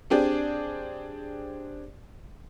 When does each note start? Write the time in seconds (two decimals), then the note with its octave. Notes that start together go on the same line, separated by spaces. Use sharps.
0.10 C4 D4 G4 G#4 D5